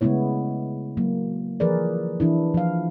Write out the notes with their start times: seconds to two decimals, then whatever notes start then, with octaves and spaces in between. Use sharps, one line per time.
0.01 C#3 G#3 A3 B3 E4 C#5
0.97 F#3 A#3
1.60 E3 F3 G#4 A#4 B4 D5
2.20 E3 D4 E4
2.54 F3 F5